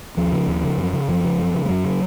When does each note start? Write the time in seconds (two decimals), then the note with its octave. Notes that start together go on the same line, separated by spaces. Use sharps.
0.17 D#2 F3
0.32 C#3
0.48 D#2
0.63 C#3
0.78 F#2
0.93 C#3
1.08 F#2 F3
1.24 C#3
1.38 F#2
1.54 C#3
1.65 G#3
1.69 F#2 F#3
1.84 C#3